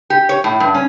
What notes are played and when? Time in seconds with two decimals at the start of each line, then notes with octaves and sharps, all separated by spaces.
0.10 G4
0.29 C#5
0.44 A2
0.60 G2
0.75 C#4